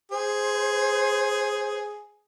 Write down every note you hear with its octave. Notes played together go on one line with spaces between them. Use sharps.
G#4 C5